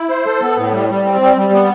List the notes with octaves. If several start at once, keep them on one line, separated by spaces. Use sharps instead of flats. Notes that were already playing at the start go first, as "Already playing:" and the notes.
Already playing: E4
C5
A4
B3
A2
G3
G3
C4
G3
G3
B3